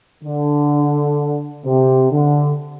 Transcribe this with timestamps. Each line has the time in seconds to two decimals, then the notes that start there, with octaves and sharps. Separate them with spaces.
0.24 D3
1.65 C3
2.12 D3